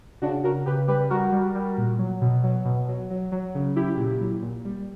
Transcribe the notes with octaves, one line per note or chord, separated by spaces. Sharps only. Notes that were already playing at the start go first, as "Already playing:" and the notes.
C#3 D4 F#4
C#3 F#4 A#4
C#3 G4 B4
G3 G4 B4
G3 F#4 A#4
G3
G3
A#2
F#3
B2
F#3
B2
F#3
F#3
F#3
C#3
F#3 E4 G4
A#2
F#3
A#2
G3